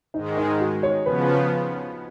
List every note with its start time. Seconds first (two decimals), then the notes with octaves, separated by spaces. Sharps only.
0.14 G#2 D#3 G#3 D#4
0.37 D#4
0.60 F#4
0.83 C#5
1.06 C#3 F3 B3 B4